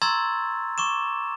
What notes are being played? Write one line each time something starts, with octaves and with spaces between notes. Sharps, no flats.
A#5 C6 C#6 E6 G#6 A6
C#6 D6 E7